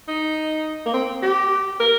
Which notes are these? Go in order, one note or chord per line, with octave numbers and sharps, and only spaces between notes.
D#4
A#3
C4
G4
A#4